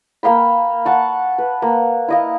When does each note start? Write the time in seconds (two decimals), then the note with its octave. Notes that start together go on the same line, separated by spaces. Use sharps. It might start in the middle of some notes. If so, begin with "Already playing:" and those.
0.23 A#3 F5 G5 B5
0.85 F#5 A5 C#6
1.38 B4
1.62 A#3
2.08 E4 D#5 F5